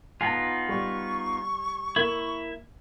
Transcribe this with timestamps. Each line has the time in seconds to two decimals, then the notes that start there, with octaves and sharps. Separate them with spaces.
0.21 B3 D#4 F4 G#5 A5
0.69 G3 C#6
1.96 A#3 E4 E5